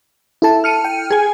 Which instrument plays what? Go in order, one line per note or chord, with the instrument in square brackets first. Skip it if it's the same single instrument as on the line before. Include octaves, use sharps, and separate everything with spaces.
[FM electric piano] E4 A4 A5
[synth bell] F6 C#7 D#7
[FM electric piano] G5
[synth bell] G#4 G#5